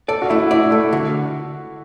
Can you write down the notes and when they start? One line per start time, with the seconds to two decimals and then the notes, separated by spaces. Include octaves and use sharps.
0.08 A4 D5
0.22 F#4
0.30 A3 E4
0.51 E4 D5
0.71 A3 A4
0.93 D3 F#4